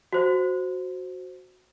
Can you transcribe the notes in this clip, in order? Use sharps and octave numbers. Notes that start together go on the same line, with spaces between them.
F#4 C5